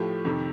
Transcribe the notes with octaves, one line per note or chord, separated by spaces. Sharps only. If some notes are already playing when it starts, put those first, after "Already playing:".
Already playing: A2 F3 A3 G4
F2 C3 D#3